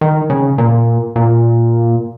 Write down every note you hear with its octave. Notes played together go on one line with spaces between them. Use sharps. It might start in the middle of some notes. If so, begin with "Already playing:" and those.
D#3
C#3
A#2
A#2